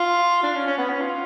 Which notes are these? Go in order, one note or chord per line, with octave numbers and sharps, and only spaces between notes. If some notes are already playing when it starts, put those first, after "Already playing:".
Already playing: F4
D4
C#4
C#4
B3
C#4
F4